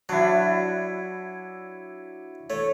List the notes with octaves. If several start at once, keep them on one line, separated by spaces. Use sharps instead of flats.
F#3 D4 E4
A3 C#5